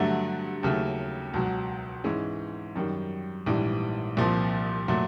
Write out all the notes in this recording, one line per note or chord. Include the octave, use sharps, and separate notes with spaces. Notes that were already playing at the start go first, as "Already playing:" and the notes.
Already playing: G2 D3 F#3 A3
D#2 C#3 F#3 A3
C#2 B2 F#3
G#2 E3 G#3 C#4
F#2 D#3 G3
A#1 G#2 E3 G3
C2 A#2 F3
A#2 F#3 A3